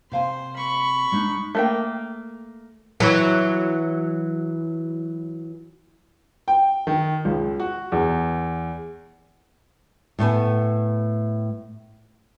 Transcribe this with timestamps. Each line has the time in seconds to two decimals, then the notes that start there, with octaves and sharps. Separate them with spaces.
0.12 C3 C5 F5 G#5
0.57 B5 C#6
1.12 G#3 D4 D#4
1.55 A3 A#3 G5
3.00 E3 F#3
6.48 G5
6.87 D#3
7.25 C#2
7.60 F#4
7.92 E2
10.19 A2 A3 B3 G#5